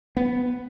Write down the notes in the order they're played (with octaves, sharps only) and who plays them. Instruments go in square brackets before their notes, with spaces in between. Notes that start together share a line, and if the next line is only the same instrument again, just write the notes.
[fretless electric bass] B3